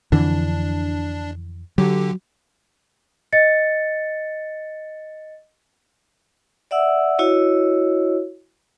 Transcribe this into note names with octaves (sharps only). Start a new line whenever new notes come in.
F2 D3 E3 D4
D3 F#3 G4
D#5 A6 C#7
D5 E5 F#5 E6
E4 F#4 C#5 D#5